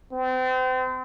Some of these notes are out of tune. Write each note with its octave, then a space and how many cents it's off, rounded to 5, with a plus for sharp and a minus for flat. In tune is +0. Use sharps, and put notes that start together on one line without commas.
C4 -35